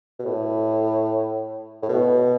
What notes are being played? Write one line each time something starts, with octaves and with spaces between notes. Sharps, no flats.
B2
A2
A2
B2